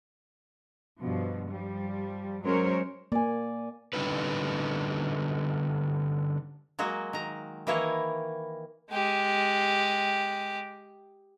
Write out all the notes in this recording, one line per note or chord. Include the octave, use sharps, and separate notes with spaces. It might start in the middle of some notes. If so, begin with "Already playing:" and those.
G2 B2 F3
F3 G3
F#3 G#3 C#4 A#4 C5 C#5
A#3 D5 G#5
D3 G3 C#4 D#4 B4
F#3 G#3 A#3 F#4
D#3 A#5
D#3 E3 A#3 E4 A#4 C#5
G#3 G4